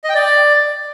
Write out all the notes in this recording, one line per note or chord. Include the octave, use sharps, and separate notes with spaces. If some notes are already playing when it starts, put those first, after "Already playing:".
D#5
G5
D5